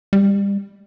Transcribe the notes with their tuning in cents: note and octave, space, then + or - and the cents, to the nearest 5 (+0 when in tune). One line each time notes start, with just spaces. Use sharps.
G3 +30